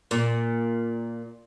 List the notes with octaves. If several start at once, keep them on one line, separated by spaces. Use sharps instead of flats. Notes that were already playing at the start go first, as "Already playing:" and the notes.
A#2